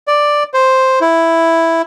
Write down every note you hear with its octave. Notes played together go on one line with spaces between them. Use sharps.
D5
C5
E4